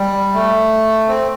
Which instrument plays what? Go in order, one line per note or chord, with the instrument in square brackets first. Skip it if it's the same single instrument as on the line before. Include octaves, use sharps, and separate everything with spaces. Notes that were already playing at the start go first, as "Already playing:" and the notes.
Already playing: [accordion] G3
A3
C4